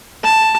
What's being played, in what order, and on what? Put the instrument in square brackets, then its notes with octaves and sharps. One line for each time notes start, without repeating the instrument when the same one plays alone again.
[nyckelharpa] A5